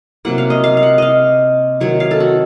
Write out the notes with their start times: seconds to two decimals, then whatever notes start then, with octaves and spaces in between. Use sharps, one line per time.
0.25 C3 F#3 A#3 F#5
0.38 F5
0.50 D#5
0.64 F5
0.77 F5
0.83 F#5
0.98 D#5 F5
1.80 C3 D#3 F#3 C#5
2.00 F5
2.11 A4
2.20 F#4